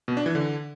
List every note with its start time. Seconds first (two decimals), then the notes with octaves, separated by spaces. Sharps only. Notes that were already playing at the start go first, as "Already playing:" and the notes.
0.08 B2
0.17 D4
0.26 E3
0.35 D3